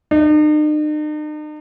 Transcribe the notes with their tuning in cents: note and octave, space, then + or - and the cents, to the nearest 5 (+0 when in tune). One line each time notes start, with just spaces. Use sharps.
D#4 -45